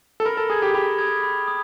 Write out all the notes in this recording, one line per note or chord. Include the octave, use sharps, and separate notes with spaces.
A4
A#4 B5
A4
G#4 D#6 G#6
G4
G4 B5
D#6 G#6
B5
D#6